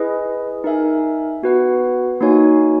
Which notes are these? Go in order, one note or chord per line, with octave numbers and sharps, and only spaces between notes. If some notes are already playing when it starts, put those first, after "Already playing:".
Already playing: E4 G#4 B4 D#5 G#5
D#4 A#4 E5 G#5
B3 F#4 B4 F#5
A#3 D#4 F#4 C#5 G#5